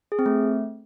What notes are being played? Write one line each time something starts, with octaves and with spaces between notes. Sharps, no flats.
G#4
C4
A3